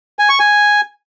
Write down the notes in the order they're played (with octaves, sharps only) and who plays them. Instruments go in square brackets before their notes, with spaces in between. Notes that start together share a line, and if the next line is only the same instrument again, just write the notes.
[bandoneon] G#5
C#6
G#5